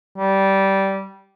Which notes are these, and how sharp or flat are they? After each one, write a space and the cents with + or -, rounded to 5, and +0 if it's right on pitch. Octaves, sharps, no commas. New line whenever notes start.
G3 -15